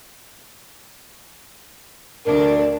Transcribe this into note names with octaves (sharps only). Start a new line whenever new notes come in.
D2 D4 A#4